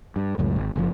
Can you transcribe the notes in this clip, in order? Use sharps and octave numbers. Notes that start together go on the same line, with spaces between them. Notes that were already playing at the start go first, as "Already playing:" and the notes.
G2
C#2 F#2 A2
G#1
F#1 C3 F3